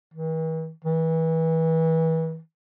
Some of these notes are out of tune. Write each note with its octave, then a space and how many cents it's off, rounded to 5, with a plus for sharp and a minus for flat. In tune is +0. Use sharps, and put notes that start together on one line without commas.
E3 -45
E3 -30